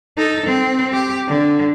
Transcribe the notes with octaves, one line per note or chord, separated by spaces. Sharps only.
D#4 A4
C4
G4
D3